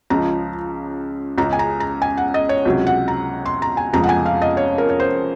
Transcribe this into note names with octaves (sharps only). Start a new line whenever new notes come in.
C#2 C#3 F3 A#5
C#2 C#3 G#3 A#5
G#5
A#5
A#5
G#5
F#5
D#5
C#5
C#2 C3 F#3
F#5
A#5
C6
A#5
G#5
F1 F2 C#3 F3 G#3 A#5
F#5
G#5
F5
D#5
C#5
A#4
C#5
C5